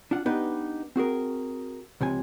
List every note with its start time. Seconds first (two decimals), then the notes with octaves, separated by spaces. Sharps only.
0.11 D4 F4 F#5
0.26 B3 D4 D#4 G4 B4
0.96 C4 F#4 G#4 A#4
2.01 C#2 C3 F3 G#5